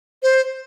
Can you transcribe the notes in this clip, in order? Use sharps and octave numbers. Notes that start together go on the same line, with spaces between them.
C5